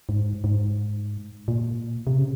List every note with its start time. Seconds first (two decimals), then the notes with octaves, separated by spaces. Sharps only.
0.09 G#2
0.44 G#2
1.48 A#2
2.07 C3
2.18 C#3